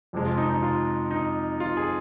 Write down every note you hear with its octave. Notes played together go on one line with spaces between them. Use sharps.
F2 C3 F3 G#3
F4
D#4
D#4
F4
D#4
F4
G#4